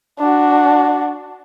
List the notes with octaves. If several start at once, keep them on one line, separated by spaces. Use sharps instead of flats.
D4 F#4